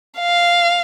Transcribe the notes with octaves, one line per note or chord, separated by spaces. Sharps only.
F5